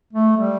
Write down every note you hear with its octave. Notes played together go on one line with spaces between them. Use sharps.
A3
G3